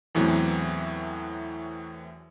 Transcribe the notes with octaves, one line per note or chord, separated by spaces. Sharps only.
E2 A2 E3 F#3 C4